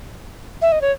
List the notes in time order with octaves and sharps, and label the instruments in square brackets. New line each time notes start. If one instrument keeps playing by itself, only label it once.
[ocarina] E5
D#5
C#5